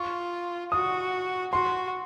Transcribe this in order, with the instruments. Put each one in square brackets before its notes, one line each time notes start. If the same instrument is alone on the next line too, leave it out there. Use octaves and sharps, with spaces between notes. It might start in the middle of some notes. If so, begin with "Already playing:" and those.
Already playing: [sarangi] F4 [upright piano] C#6
[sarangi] F#4 [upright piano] D#6
[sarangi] F#4 [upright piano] C6